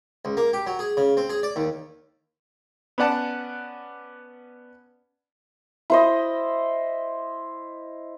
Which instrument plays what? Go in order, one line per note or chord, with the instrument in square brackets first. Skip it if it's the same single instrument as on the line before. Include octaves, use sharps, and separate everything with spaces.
[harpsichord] C#2
A#3
G4
F#3
G#4
C#3
C4
G#4
D5
D#2
[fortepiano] B3 C#4 D5 F#5 A5
[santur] E4 C5 D#5